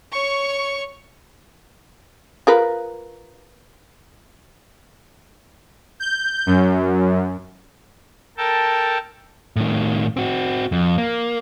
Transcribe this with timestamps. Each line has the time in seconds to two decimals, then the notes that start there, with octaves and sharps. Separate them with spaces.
0.12 C#5 C#6
2.47 F4 A#4 B4
6.00 G6
6.46 F#2
8.37 A4 A#4 G5 A5
9.56 A2 D#3
10.17 C4 F#4
10.72 F2
10.98 A#3